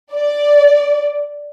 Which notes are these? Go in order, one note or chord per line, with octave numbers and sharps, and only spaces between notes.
D5